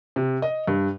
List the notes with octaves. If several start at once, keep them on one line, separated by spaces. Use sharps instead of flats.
C3
D#5
G2